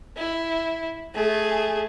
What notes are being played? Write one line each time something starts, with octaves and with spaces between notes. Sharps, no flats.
E4
A3 G#4